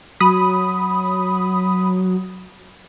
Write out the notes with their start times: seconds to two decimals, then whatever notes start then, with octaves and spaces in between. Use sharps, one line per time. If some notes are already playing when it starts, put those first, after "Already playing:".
0.20 F#3 B5 D#6